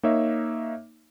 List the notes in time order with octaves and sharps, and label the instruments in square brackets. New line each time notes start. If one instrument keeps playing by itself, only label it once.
[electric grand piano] A#3 D#4 C#5 E5